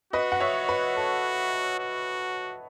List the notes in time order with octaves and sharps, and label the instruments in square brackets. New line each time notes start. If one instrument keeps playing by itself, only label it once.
[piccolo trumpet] F#4 [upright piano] B4 D#5
[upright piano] F#5
C#5 E5
B4
A4
[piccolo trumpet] F#4